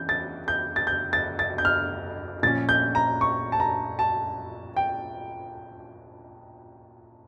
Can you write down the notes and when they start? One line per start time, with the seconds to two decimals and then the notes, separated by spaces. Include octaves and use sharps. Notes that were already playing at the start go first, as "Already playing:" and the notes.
Already playing: E3 C#4 G6
0.09 A6
0.48 G6
0.76 A6
0.87 G6
1.13 A6
1.39 A6
1.58 G6
1.65 F6
2.43 A#2 F3 C#4 A6
2.69 G6
2.95 A#5
3.21 C#6
3.52 A5
3.60 A#5
3.99 A5
4.77 G5